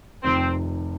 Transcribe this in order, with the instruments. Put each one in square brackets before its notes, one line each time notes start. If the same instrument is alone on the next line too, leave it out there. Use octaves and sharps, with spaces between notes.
[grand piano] F1 F2 C3 D#3 [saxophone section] C4